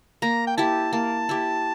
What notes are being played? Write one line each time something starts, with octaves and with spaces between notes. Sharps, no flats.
A#3 A#5
G5
E4 G4 A5
A#3 A5
E4 G4